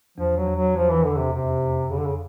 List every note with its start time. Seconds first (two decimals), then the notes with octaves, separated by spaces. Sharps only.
0.18 E2 F3
0.37 F#3
0.47 E2
0.56 F#3
0.76 E2 F3
0.90 E3
1.04 E2 D3
1.19 C3
1.33 F2 C3
1.62 F2
1.90 F2 C#3
1.98 D3
2.06 C#3